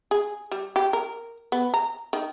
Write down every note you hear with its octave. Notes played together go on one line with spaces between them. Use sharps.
G#4
G3
G4
A#4
B3
A#5
D#3